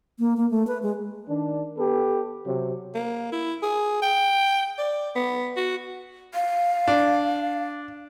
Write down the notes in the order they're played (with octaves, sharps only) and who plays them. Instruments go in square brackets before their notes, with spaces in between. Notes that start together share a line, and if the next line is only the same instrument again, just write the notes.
[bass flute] A#3
A#3
A3
B4
G#3
[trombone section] D#3 D4
B3 G4 A4 B4
C3 F#3
[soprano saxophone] A#3
E4
G#4
G5
D5
B3
F#4
[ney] F5
[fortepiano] D4